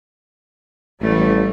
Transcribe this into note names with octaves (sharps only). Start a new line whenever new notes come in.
A1 E3 G3 A3